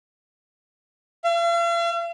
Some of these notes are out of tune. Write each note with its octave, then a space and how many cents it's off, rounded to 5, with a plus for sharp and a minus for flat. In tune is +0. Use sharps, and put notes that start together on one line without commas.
F5 -45